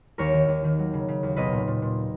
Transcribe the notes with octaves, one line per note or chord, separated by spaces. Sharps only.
D#2 A#4 C#5
D#3
D#2
D#3
F#3
C#3
C#3
D#2
B1 B4 D#5
A#2
A#2
A#2